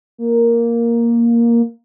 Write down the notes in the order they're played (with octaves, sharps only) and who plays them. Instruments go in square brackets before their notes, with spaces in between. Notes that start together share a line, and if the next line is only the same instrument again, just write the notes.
[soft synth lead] A#3